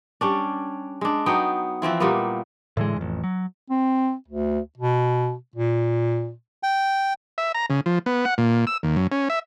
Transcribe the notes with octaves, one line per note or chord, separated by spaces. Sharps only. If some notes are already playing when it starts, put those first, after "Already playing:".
G3 C#4 D4
G#3 D4
F#3 B3 D#4 G5
E3 F3 C4 E4
A#2 G3 A#3 B3
A2 D3 E3 G#3
A1 F2
F#3
C4
D2
B2
A#2
G5
E5
A#5
C#3
F3
B3
F#5
A#2
E6
D#2
F#2
C#4
E5